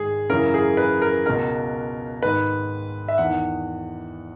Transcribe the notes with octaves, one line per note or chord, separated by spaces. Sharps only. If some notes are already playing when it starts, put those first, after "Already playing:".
Already playing: G#2 D#3 G#4
F#2 C#3 E3 A#4
G#4
B4
A#4
C#2 B2 A#4
G#2 D#3 B4
E5
E2 D#3 F#5